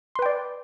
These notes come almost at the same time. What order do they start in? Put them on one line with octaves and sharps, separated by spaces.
C6 B4 G5 D5